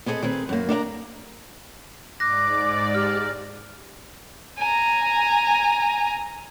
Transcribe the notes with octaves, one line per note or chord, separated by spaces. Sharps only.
B3 C4 G#4 A4 D#5
D#3 C4 G#4 B4
F#2 A#3
D4 A#4 E5 A#5
G#2 D5 D6 F#6 A#6
G4 F6
G#5 A#5